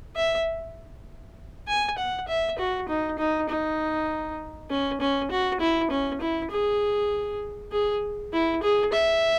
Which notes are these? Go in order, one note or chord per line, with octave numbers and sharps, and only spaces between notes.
E5
G#5
F#5
E5
F#4
D#4
D#4
D#4
C#4
C#4
F#4
E4
C#4
E4
G#4
G#4
E4
G#4
E5